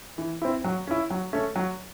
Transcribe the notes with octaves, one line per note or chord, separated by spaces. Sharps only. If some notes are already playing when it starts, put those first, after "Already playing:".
E3
C4 E4
F#3
C#4 E4
F#3
A3 C#4
F#3